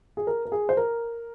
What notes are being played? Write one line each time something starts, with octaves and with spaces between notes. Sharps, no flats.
G#4
A#4
A#4
G#4
C5
A#4